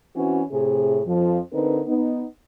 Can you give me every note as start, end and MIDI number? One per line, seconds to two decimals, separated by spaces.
0.15 0.42 52
0.15 0.42 60
0.15 0.42 61
0.15 0.42 64
0.15 0.42 66
0.52 1.01 45
0.52 1.01 48
0.52 1.01 68
1.07 1.39 41
1.07 1.39 53
1.53 1.82 50
1.53 1.82 60
1.53 1.82 63
1.53 1.82 70
1.53 1.82 71
1.87 2.25 59
1.87 2.25 63